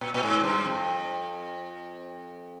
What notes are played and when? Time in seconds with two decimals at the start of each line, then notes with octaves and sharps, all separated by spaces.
0.01 A#2
0.14 A#2
0.23 G#2
0.44 G2
0.64 F2